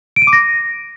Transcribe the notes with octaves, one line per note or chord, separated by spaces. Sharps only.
D7
D#7
D6
A#6